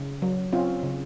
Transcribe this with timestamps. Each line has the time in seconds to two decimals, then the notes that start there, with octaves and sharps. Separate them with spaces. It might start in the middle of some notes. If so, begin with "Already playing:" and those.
Already playing: C#3
0.22 F#3
0.53 C4 C#4 F4
0.83 C#3